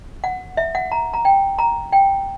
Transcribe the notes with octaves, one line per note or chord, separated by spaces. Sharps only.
F#5
E5
F#5
A#5
A#5
G5
A#5
G5